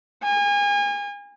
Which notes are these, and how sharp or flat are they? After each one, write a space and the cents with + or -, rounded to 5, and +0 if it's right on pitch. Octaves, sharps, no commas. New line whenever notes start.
G#5 -35